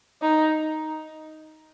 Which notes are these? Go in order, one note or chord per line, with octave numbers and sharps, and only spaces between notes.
D#4